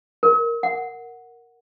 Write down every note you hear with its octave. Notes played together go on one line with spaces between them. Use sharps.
A#4
F#5